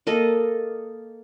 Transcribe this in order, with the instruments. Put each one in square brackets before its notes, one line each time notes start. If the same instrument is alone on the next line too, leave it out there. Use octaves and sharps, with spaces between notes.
[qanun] A#3 A4 D#5